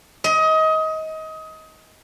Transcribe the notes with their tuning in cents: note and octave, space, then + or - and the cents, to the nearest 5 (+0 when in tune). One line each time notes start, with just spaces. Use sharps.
D#5 +25